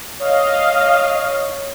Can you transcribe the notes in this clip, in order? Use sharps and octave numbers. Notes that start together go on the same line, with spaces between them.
C#5 D#5 F5